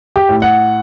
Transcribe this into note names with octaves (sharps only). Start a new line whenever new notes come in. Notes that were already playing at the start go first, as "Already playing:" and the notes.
G4
A2
F#5